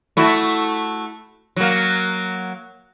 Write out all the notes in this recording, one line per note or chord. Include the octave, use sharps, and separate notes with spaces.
A3 E4 F#4
F#3 A#3